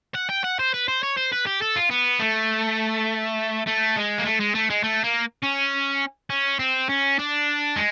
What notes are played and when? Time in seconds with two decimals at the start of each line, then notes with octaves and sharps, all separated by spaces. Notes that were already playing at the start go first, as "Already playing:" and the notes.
0.15 F#5
0.30 G5
0.44 F#5
0.59 C5
0.74 B4
0.88 C5
1.03 C#5
1.17 C5
1.33 B4
1.47 G4
1.62 A4
1.76 F4
1.91 B3
2.20 A3
3.67 A3
3.96 G#3
4.18 A#3
4.25 A3
4.40 G#3
4.54 A3
4.70 G#3
4.83 A3
5.04 A#3
5.43 C#4
6.30 C#4
6.59 C4
6.89 C#4
7.19 D4
7.76 G#3